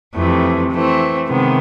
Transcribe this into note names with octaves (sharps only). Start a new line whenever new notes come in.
F2 C3 E3 A3
E3 A3 C4
C3 D#3 G#3 B3